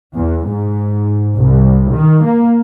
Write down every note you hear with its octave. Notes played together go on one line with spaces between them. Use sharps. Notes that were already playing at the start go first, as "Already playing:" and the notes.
E2
G#2
C2
D#3
A#3